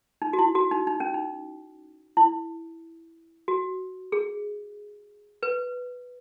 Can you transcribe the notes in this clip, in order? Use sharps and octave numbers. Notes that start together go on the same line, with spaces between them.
D#4
F#4
E4
F#4
D#4
D#4
C#4
D#4
E4
F#4
G#4
B4